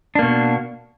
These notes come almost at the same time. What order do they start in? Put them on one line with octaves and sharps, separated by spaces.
D4 A#3 B2